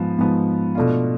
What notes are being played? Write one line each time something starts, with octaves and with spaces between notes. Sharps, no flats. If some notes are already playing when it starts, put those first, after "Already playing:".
Already playing: G#2 F3 B3
G#2 F3 B3
B2 A3 D4 F4